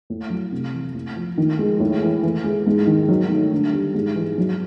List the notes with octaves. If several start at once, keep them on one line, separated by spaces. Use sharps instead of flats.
A2
F#3
C3
E3
A2
F3
D#3
G#3
A2
E3
E3
G#3
G#2
D#3
F#3
A3
D3
G3
G#2
E3
F#3